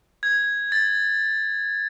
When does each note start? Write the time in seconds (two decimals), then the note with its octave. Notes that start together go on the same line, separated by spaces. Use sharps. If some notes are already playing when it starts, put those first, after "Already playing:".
0.23 G#6
0.72 A6